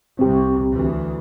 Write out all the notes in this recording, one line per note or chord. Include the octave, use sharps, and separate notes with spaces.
C2 C4 G4
D2 E3